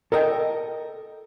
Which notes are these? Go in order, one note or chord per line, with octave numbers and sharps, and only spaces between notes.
A4 A#4 D#5 G5